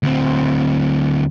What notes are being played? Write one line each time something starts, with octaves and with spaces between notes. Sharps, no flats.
D2 C4